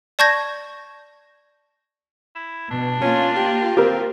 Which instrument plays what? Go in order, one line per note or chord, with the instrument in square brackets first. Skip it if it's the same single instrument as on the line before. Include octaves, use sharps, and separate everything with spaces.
[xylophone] D5 A5 C#6 G6 G#6 A#6
[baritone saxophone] E4
[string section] B2 [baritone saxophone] D4
[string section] A#3 F4 [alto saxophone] C#4
[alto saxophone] G4
[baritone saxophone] D2 [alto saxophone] C4 [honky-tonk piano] G4 A#4